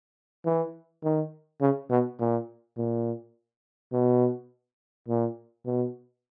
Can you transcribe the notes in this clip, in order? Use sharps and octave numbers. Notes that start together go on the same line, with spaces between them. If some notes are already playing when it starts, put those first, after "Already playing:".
E3
D#3
C#3
B2
A#2
A#2
B2
A#2
B2